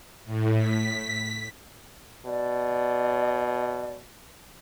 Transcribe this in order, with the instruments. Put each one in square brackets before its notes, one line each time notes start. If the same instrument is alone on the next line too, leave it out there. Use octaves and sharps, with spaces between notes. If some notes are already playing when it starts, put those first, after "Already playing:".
[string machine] A2
B6
[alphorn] B2 [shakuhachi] D5